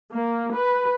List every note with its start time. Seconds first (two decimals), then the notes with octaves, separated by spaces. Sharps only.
0.13 A#3
0.55 B4